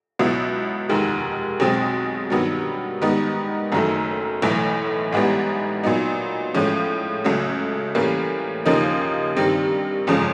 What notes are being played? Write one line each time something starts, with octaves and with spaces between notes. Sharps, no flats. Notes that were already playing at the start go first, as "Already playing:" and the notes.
C#2 B2 F#3 B3 E4
F1 D#2 D#3 G#3
B1 B2 G#3 C4
G2 D#3 F#3 B3
G#2 D#3 G3 B3 D#4
F#1 F#2 D#3 F#3 A3
B1 A2 E3 A3
A1 G#2 E3 G3 B3
A#2 F#3 B3 D#4
A2 F3 G#3 C#4
C#2 C#3 F#3 A3
A2 E3 G3 A#3 C#4
D#2 C#3 F3 A#3 D#4
G2 D#3 G3 C4
G1 F2 C#3 F3 G#3